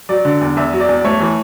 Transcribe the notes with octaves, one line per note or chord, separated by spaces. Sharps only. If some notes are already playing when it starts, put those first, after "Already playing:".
F#3 D5
D3
E2
E2 E5
F#3
D5
E2
A3 C#5
E3